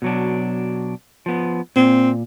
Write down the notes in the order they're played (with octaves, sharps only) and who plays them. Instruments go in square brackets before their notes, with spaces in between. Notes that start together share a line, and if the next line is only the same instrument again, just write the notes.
[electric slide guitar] B2 F#3 D4
F3 B3
[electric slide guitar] A#2 [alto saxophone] C4